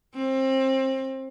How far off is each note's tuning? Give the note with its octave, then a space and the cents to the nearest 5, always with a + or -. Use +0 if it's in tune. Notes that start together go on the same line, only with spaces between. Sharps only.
C4 +25